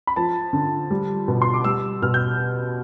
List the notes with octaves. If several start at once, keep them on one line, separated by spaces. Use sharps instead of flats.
B5
F3 A5
D3
G3
B2
C6
D6
G3 E6
B2 F6
G6